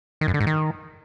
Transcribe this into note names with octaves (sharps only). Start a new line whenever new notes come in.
D#3
F#2
D3
G#2
D#3